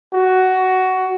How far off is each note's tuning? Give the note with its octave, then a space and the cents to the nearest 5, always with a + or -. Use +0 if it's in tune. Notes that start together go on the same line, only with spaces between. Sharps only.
F#4 +10